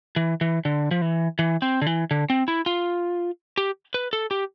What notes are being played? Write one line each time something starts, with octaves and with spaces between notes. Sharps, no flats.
E3
E3
D3
F3
E3
E3
C4
D3
E3
D3
C4
E4
F4
G4
B4
A4
G4